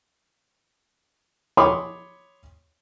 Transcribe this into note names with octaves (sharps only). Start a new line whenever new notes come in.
C#5 B5 C6 D6 D#6